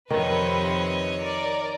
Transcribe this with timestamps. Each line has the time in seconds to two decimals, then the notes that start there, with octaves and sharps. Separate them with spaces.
0.10 F2 C3 D#3 B4 C#5 D#5
1.21 A#4 D5